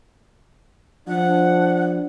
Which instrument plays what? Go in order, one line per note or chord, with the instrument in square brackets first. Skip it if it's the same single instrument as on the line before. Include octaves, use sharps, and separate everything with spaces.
[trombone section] F3 D4 [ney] F#5